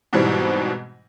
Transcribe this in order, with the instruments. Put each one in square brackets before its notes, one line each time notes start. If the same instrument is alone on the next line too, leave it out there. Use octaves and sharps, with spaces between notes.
[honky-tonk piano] G#2 B2 E3 G3 C4